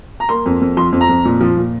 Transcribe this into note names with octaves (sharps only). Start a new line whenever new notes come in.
A#5
A#3 C6
F2
F2
F3 C6
F2
A#5
F2
A#2
F3
A#2